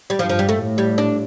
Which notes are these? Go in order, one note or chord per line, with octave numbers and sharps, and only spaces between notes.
G3
G2 F3
F3
G3
A3
A2
G3
D4